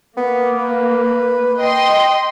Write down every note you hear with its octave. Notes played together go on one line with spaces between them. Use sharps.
A#3 B3
B4
D#5 G5 C6